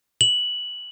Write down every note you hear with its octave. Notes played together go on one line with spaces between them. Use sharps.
F#7